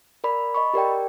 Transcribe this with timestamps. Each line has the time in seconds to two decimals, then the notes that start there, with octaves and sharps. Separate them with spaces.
0.24 A#4 D5 B5
0.54 D#5 B5 C#6
0.74 G4 A#4 D5 G5